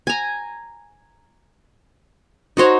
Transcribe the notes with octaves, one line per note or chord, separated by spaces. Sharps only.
G#5 A#5
D#4 F#4 C5 C#5